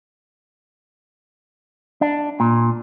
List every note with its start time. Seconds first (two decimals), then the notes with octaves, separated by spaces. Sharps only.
2.01 D4
2.40 A#2